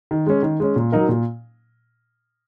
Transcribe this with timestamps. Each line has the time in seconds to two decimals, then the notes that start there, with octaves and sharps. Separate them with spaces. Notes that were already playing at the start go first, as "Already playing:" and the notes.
0.11 D#3
0.27 G#3 C#4
0.43 D#3
0.60 G#3 C#4
0.76 A#2
0.92 F#3 D#4 A#4
1.09 A#2